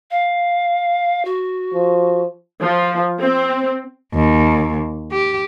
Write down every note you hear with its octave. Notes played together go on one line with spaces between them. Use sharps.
F5
F#4
F3
F3
C4
D#2
G4